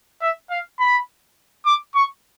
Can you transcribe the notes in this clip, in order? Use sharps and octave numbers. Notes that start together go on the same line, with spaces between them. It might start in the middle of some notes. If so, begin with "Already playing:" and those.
E5
F5
B5
D6
C#6